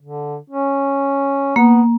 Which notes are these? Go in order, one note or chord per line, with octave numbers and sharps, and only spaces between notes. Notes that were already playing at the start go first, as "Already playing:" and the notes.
D3
C#4
A#3 B3